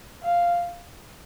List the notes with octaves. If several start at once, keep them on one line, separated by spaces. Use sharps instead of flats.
F5